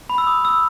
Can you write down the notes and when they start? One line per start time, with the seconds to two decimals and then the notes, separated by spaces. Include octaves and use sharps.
0.10 B5
0.18 E6
0.27 D#6
0.45 E6